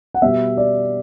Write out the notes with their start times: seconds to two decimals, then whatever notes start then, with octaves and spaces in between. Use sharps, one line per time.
0.14 F#5
0.22 B2 G3 B3 E5
0.57 D5